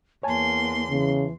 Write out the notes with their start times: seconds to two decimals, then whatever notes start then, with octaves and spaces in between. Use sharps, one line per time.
0.23 E2 A#3 C#5 G#5 A5 C6
0.91 C#3 E3